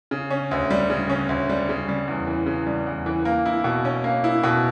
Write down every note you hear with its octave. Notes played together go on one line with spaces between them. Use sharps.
C#3
C#4
D2
G3
C#3
C#4
D2
G3
C#3
G3
E2
E3
C#3
G3
E2
E3
A#3
E4
B2
C#4
A#3
E4
B2